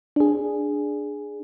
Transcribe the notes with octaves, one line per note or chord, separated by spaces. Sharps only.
D4 G#4